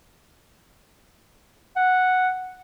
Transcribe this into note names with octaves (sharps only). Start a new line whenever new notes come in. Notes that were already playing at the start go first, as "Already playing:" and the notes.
F#5